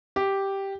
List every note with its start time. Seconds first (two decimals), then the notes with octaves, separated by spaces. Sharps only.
0.16 G4